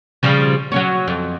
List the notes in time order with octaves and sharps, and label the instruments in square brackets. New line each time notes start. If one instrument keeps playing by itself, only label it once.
[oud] C#3 F3 G3
F#3 C#4 C#5
F2